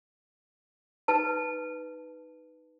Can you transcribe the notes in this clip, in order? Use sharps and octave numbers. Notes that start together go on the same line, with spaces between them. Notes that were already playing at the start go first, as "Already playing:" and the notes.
D#4 B4 A5